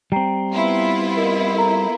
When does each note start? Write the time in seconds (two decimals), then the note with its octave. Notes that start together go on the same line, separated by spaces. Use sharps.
0.12 G3 C4 G5 A#5 C7
0.53 B3 E4 F4
1.17 A#4 D#5
1.55 A4 A#4 A#5